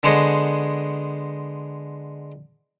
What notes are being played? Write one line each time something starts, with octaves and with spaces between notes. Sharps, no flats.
D3 G#3 B3 C5 C#5 D#5